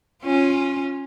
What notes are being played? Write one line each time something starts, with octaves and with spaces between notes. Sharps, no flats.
C#4 F4